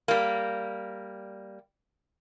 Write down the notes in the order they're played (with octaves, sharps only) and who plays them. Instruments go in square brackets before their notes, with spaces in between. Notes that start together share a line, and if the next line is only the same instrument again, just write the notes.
[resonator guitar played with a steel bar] G3 A#3